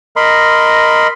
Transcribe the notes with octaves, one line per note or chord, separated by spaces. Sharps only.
A#4 D#5 B5 C6